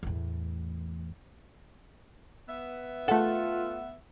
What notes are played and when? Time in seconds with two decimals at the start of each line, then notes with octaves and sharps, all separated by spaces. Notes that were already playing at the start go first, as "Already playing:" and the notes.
0.03 E2 A2
2.48 B3 E5
3.08 A3 F4 A4 F#5